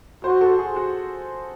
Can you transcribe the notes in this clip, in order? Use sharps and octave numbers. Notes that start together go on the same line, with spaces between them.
F#4 C5
A4
G#4
F#4